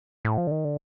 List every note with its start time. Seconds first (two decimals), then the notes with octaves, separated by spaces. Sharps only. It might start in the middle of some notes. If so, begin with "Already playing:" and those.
0.25 A2
0.38 F3
0.47 D3
0.51 D#3
0.65 D3